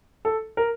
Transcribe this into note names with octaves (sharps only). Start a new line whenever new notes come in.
A4
A#4